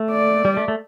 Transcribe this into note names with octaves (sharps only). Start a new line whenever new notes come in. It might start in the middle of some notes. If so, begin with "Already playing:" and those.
Already playing: A3
D5
G3
A3
A3